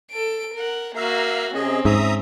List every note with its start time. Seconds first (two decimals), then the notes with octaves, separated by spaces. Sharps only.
0.11 A4 D7
0.55 A#4 F#5
0.96 A#3 F#4 E5 F5 A#5
1.55 C3 C4 C#4 G#4 D#5
1.85 G#2 E5 A#5 D#6